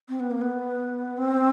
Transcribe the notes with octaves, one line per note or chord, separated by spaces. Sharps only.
C4
B3
A#3
B3
C4